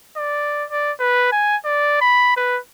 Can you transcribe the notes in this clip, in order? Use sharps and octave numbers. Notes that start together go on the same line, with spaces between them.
D5
D5
B4
G#5
D5
B5
B4